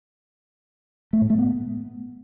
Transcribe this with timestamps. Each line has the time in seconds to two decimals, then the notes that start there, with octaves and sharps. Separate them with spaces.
1.13 A3
1.21 A2
1.30 A3
1.38 B3